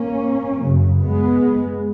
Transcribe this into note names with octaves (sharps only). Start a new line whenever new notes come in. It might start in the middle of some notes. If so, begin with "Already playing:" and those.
Already playing: A#3 C#4
F#2 C#3
G#3 B3